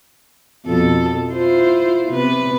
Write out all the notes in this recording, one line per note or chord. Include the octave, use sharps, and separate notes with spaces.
F2 B2 A4
E4 F4 C5
C3 B3 B4